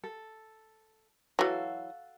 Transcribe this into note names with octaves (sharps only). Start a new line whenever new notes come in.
A4
E3 F#3 F#4 A4 F5